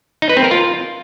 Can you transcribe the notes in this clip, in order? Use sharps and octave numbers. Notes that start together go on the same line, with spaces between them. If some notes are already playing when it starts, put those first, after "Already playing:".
D#4
B4
C4
A#4
F4